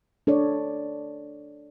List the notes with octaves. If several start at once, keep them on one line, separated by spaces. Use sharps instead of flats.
D4 A4 C#5 D5